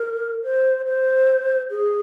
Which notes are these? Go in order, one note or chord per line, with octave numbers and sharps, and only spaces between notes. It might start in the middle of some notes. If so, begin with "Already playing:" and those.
Already playing: A#4
C5
C5
G#4